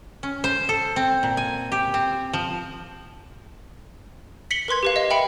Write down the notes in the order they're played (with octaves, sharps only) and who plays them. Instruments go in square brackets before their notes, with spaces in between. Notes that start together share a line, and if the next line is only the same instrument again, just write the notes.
[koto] C#4
C5
A4
C4
A#2
G#5
G4
C4
F3
[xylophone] B6 C#7 F#7 G7
A#4 B4 C6 G#6
G4 B4 F5
D#5 F5
E5 G5 B5 C#7